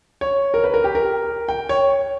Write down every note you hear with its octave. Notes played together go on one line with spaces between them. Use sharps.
C#5
A#4
B4
A#4
G4
A#4
G5
C#5